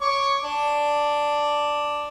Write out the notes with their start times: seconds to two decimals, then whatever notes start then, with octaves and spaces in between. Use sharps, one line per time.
0.01 C#5 C#6 D6
0.44 D4